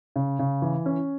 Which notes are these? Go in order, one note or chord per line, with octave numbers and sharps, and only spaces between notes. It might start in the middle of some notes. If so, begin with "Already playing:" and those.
C#3
C#3
E3
C#4